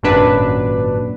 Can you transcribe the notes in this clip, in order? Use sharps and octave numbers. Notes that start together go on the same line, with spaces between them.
G#1 F#2 A#2 F#3 D4 B4